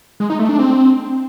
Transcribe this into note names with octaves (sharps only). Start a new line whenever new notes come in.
G#3
D#4
A3
D4
C4